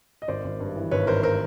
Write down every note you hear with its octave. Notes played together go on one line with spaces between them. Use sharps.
D#5
G#1 C5 D5
G#1
G2
E3
G#1 B4 C#5
G#1 A#4 C5
A#4 C5